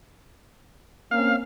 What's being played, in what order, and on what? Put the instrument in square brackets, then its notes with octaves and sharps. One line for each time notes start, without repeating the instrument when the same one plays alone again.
[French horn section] A#3 C4 C#4 [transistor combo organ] F5